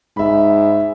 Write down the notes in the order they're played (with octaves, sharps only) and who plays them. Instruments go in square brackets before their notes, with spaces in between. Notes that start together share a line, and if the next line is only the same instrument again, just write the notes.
[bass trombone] G#2 [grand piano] E5 B5